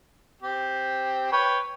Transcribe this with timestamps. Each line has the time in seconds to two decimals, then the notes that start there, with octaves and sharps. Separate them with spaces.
0.42 C4 G4
1.32 B4 C#5 G5